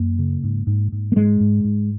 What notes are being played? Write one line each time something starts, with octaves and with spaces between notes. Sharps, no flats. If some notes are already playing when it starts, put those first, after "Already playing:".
Already playing: F#2 A#3
C#3
G#2
G#2
G#2
A#3
G#2 G#3
G#2
G#2